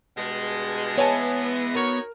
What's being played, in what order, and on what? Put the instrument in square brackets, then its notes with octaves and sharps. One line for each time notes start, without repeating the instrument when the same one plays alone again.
[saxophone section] G2 B2 G#3
[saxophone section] E3 G#3 [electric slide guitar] B3 [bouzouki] C#5 G#5 A5
[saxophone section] D#4 F#4 C#5 [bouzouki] A#4